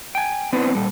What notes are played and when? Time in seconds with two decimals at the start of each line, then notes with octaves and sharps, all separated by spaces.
0.15 G5 G#5
0.53 B3 C4 D4 E4 B4 C5
0.75 A#2 G3 A4